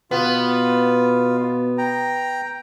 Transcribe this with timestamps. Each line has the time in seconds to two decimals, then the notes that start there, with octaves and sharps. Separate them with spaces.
0.11 B2 B3 F4
1.78 G5 A#5